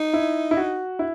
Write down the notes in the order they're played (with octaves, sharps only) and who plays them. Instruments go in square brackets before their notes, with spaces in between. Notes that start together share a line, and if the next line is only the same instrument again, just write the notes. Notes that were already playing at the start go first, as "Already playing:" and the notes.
Already playing: [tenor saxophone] D#4
[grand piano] E4
E4
F#4
E4